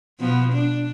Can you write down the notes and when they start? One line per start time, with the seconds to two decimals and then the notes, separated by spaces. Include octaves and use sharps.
0.19 B2 F3 B3
0.53 D4